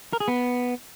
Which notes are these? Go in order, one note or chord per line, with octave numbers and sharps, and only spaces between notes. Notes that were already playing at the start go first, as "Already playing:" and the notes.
A#4
G#4
B3